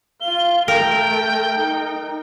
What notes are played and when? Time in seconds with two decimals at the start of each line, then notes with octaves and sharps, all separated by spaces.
0.21 F4 F5 G7
0.68 A3 A#4 G5
1.57 D#4